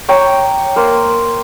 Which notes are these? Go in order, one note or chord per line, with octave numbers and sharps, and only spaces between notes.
C#5 G5 A#5 D6
A#3 C5